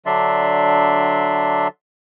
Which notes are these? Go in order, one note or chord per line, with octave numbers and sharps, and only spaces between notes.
D3 F#3 D4 D5 E5 C6